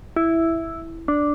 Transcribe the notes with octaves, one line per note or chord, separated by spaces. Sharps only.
E4
D4